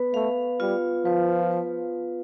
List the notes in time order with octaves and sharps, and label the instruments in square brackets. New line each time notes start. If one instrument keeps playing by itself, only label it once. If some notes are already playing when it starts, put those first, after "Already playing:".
Already playing: [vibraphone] B3 B4
[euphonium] A3 [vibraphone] F5
[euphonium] G3 [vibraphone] F4
[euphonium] F3 [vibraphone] B4
[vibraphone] B4